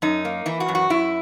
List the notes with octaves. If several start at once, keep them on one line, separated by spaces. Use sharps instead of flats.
F#2 D#4
A#3
E3 E4
F#4
F#2
F#4
F#2 E4